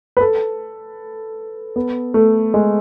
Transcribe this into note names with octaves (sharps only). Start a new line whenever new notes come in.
B4
A4
B3
A3
G#3